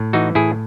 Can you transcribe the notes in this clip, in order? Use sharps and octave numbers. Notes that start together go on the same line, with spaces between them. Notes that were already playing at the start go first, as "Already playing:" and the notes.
Already playing: A2
E3 D#4 F#4
A2 E4 G#4